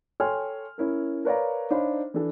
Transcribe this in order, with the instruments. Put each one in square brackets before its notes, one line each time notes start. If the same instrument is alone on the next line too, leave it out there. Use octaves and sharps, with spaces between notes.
[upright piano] A4 C#5 G5 G#5 C6 F6
C#4 E4 A#4
A#4 B4 C#5 D5 F5 A#5
D4 D#4 C5 C#5 F5 B5
E3 D4 E4 A4